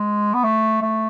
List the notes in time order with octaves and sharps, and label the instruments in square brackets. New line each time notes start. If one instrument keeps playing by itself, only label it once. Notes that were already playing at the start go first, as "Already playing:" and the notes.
Already playing: [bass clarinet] G#3
B3
A3
A3